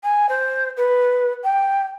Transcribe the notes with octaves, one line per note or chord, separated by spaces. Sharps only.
G#5
C5
B4
G5